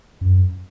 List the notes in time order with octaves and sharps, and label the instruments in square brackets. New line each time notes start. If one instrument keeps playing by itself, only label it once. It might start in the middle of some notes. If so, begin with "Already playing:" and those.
[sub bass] F#2